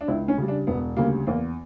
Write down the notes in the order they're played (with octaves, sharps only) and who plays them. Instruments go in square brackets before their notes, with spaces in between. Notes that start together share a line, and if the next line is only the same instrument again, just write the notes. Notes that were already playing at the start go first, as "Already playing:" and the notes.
[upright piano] D4
C#2 E4
C#4
C#3 G3
D4
E1 B3
D2 C#3 G3 A#3
E2 A#3